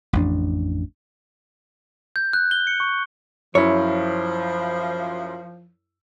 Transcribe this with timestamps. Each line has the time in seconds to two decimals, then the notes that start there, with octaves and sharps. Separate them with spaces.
0.13 A1 F2 D4
2.16 G6
2.33 F#6
2.51 G7
2.67 C#7
2.80 C#6
3.55 F#2 F3 E4 C#5